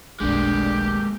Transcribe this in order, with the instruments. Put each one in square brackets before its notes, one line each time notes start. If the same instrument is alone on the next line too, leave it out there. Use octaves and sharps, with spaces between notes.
[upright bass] F1 B1 [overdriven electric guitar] G#3 A#3 [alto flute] D4 [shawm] G4